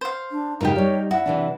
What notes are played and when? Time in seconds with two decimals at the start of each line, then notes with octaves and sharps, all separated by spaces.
0.01 C5 F5
0.31 D4
0.61 G#2 C#3 D#4 F4 G4 A#4
0.76 G3 D#4 C#5
1.11 E4 F#4 E5
1.26 C3 E3 D4